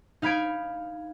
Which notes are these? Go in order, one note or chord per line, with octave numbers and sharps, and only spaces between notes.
D#4 F5 B5 G#6 D7